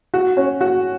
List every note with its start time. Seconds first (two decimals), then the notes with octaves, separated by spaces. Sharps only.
0.14 F#4
0.37 C#4
0.61 F#4